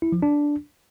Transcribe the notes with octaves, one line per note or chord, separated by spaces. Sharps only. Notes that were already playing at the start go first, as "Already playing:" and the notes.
E4
F3
D4